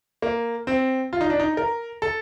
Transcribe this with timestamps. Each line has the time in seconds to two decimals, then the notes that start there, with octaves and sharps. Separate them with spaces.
0.22 A#3
0.67 C4
1.13 F4
1.21 D#4
1.30 D4
1.40 D#4
1.57 A#4
2.02 A4